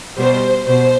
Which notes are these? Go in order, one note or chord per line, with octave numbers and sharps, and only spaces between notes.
B2 G3 C5
B2 C5